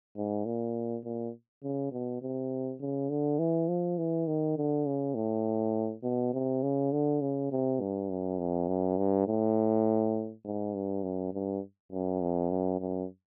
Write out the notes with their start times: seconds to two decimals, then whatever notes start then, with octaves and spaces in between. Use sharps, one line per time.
0.16 G#2
0.45 A#2
1.04 A#2
1.63 C#3
1.92 B2
2.22 C3
2.81 C#3
3.10 D3
3.39 E3
3.68 F3
3.98 E3
4.27 D#3
4.57 D3
4.86 C#3
5.15 A2
6.03 B2
6.33 C3
6.62 C#3
6.92 D3
7.21 C#3
7.51 C3
7.81 G2
8.10 F#2
8.39 F2
8.68 F#2
8.98 G2
9.27 A2
10.45 G#2
10.74 G2
11.03 F#2
11.34 G2
11.92 F#2
12.21 F2
12.50 F#2
12.81 F#2